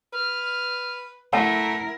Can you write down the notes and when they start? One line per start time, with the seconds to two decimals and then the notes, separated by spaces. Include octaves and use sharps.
0.13 B4 F6
1.33 A3 E4 A#4 E5 F#5 A5